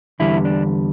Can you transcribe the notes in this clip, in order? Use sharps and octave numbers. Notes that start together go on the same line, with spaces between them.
E2 D3 G3 E4
D4